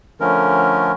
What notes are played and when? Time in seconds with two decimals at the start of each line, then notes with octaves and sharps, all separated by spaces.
0.20 D3 F3 A3 C#4 A#4